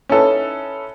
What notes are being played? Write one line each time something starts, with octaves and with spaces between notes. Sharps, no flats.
C#4 D#4 E4 A4 B4